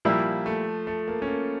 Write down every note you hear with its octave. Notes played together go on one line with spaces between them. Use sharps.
A#2 F3 G3 A#3 E4
A3
A3
A#3
C#4
A#3